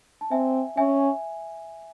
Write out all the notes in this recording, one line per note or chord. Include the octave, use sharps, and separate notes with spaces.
A5
C4 E5 G#5
C#4 E5 G#5